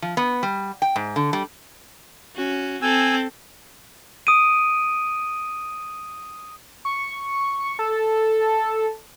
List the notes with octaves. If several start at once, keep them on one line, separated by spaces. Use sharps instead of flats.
F3
B3
G3
G5
G#2
D3
G3
C#4 F#4
C4 A4 G#5 E6
D#6 D7 D#7
C#6
A4